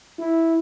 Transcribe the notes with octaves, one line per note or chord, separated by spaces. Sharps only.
E4